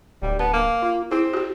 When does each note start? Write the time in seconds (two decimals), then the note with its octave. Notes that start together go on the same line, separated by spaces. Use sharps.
0.22 D1 G3
0.39 B3 A5
0.53 A#3
0.82 F4
1.11 C4 E4 G#4
1.34 F#4 G4